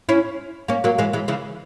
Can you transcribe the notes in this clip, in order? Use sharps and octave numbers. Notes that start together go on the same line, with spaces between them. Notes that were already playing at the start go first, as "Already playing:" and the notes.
C#4 E4
A#3 C#4
F#3 A#3
E3 G#3
E3 G#3
C#3 E3